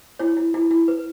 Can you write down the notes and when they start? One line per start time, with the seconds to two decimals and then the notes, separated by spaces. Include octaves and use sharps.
0.19 E4 C#5
0.37 E4
0.54 E4
0.71 E4
0.88 B4